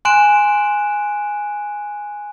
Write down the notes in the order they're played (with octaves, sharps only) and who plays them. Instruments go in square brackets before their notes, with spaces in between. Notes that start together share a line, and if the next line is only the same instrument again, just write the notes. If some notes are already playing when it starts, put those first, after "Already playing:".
[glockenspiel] G#5 C6 F#6 D7 E7